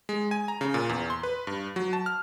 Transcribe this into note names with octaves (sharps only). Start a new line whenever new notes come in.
G#3
G#5
A#5
C#3
A#2
E2
C6
B4
G2
F#3
A5
F6